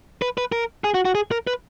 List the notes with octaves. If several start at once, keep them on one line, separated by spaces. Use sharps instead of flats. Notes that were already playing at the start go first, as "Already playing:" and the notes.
B4
B4
A#4
G#4
F#4
F#4
G#4
A#4
B4